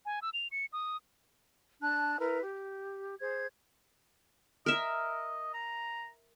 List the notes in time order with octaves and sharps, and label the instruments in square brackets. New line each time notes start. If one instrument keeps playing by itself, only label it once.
[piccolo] G#5
E6
F7
C#7
D#6
[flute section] D4 A5 F#6
E4 A#4 B4
G4
G#4 C5 G#6
[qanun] A#4 E5 [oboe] D#5
[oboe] A#5